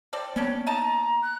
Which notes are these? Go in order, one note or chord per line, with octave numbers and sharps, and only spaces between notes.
C4 A4 D5
G3 A#3 B3 C#4 D4
D#4 D#5 A5 A#5
F#6